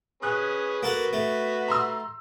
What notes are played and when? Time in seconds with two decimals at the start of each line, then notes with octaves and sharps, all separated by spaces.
0.22 C#4 G#4 B4 D#6 F#6
0.83 A#3 F#4 A4 B4 F#5
1.13 A3
1.68 A#5 C6 E6